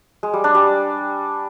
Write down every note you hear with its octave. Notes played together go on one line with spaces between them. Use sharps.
G#3
G3
D4
G3